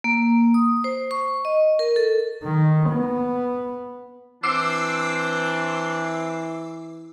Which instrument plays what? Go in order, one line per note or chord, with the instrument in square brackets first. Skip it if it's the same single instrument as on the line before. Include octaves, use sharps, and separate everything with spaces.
[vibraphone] A#3
D#6
C5
C#6
D#5
A#4
A4
[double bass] D#3
B3
[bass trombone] E3 [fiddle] C4 [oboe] D4 [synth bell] D6 E6 C7